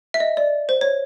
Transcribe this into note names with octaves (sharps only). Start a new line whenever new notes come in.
E5
D#5
D5
C5
C#5